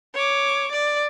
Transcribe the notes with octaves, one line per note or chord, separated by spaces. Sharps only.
C#5 D6
D5